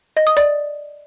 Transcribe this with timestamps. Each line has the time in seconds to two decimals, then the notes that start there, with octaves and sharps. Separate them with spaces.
0.17 D#5
0.27 D#6
0.37 D5